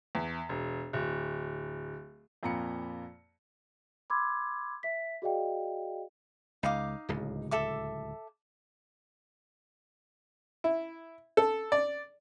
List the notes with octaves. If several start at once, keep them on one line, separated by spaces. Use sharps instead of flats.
E2
E1
D1
F2 A#2 A#5 B5 C#7
B5 C6 D6 E6 G#6
E5 B6
F#4 G#4 D5 D#5 F5 G5
C#2 D#4 F5 D6
D1 C#2
A4 E5 D6
E4
A4
D5